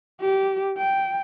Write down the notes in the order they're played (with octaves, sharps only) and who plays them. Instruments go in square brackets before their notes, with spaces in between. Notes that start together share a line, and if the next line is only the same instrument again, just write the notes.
[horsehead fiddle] G4
G5